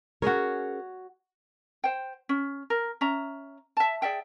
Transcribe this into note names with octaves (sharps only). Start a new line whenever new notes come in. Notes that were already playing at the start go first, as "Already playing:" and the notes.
C#4 F#4 G#4 A#4 C#5
C5 G5
C#4
A#4
C#4 E5 A#5
E5 A5
G#4 D5 E5 G5